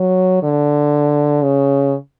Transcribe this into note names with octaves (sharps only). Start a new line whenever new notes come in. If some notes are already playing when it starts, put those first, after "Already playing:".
Already playing: F#3
D3
C#3